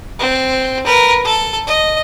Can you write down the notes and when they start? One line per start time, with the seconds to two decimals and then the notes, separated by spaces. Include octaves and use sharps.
0.19 C4
0.86 A#4 B4
1.25 A4
1.67 D#5